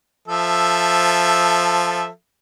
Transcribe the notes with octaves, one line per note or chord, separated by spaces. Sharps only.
F3 A4 E5